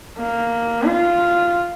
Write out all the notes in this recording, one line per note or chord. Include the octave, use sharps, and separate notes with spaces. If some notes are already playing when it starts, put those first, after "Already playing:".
A#3
F4